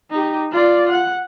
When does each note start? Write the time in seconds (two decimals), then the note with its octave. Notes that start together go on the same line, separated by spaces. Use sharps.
0.11 D#4 G4
0.52 F4 D5
0.89 F#5